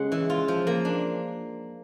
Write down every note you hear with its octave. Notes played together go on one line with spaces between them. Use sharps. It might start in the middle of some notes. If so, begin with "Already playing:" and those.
Already playing: C#3 G#3 F#5
E3
F4
F3
A#3
D4